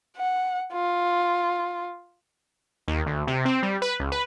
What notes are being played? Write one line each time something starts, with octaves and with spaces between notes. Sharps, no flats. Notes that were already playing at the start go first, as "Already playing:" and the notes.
F#5
F4
D#2
D2
C3
C4
G3
B4
C#2
B4